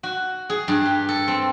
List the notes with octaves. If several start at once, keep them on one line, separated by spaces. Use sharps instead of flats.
F#4
G#4
G2
G4
A4
C4